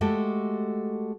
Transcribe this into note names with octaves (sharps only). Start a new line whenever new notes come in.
G#3 A3 F#4 G4 A4